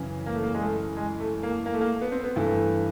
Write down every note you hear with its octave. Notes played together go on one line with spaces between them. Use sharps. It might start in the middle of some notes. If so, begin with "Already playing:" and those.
Already playing: F#2 C#3 E3
A#3
A3
A#3
G#3
A3
G#3
A3
A#3
A#3
A3
A#3
B3
C4
B3
G2 E3 A3